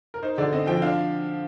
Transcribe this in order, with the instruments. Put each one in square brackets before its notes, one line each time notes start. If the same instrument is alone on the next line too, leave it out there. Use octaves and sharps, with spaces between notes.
[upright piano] A#4
D#4 C5
D3 D5
C4 D#5
F3 G5
D4 F5